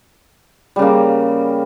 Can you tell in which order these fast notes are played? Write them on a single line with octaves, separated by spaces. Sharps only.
G3 C#3 A#3